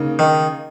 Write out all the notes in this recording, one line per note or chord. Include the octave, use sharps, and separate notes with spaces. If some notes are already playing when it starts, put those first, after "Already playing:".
Already playing: C#3 A#3 D#4
D#3